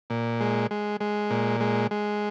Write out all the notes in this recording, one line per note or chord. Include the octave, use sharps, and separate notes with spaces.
A#2
G#3
G#3
G#3
A#2
G#3
G#3